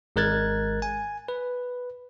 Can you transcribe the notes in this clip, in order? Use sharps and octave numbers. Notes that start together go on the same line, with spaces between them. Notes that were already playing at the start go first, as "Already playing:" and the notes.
G#1 G#3 A#4 F#6 G#6 A6
G#5
B4